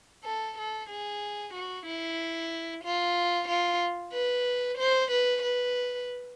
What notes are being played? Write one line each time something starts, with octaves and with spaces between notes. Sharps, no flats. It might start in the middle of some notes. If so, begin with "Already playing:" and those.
A4
A4
G#4
F#4
E4
F4
F4
B4
C5
B4
B4